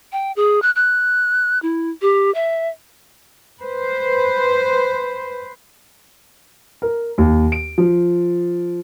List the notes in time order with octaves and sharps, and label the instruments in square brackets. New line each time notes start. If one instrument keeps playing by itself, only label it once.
[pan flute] G5
G#4
F#6
F#6
E4
G4
E5
[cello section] B4 C5
[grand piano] A#4
D#2
D7
F3